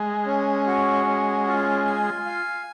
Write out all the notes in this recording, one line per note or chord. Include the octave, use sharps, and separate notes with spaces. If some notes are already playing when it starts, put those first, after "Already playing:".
Already playing: G#3
C#4
F#4
C#4
F4
G#5
F5